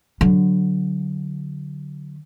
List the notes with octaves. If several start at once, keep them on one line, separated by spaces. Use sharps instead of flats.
D3 F#3